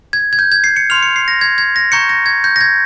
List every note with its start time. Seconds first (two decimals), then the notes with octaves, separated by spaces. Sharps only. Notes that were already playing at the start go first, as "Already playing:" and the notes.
0.13 G#6
0.33 G#6
0.39 G6
0.52 G#6
0.64 C7
0.76 C#7
0.90 C6 F6 F7
1.03 C#7
1.16 C7
1.28 A#6
1.41 G#6
1.58 G#6
1.76 A#6
1.92 A#5 C#6 G6 C#7
2.09 A#6
2.26 G#6
2.44 G6
2.56 A#6
2.61 G#6